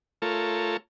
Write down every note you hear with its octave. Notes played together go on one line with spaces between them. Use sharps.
A3 F4 A4 A#4 C#5